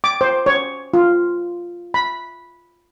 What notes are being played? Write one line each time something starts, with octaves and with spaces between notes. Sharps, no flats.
D6
C5
C#5
F4
B5